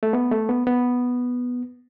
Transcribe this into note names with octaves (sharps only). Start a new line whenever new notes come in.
A3
B3
A3
B3
B3